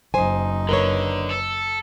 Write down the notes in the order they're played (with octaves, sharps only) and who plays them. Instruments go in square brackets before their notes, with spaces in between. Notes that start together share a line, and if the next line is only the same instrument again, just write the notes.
[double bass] F#1 D#4 [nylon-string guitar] C5 G#5
[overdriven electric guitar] D3 [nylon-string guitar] A#4 B4 C#5
[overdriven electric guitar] A4